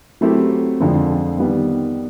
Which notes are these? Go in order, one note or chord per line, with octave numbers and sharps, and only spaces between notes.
F#3 A3 C4 E4 G4
F2 D3 F3 G#3 C4
D#3 G3 B3